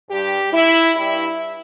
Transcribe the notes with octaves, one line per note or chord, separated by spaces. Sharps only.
G2 G3 G4
E4
G2 G3 E4